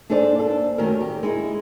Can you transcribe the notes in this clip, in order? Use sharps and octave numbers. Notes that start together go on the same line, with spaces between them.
D4 D#4 G#4 A4 C5 D5
A#3 A4
F#2 D#3 A3 C#4 G4 A#4
G4
G#3 D#4 E4